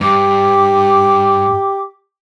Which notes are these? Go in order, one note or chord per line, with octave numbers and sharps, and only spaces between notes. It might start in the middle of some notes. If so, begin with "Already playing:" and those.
G2 G4 D6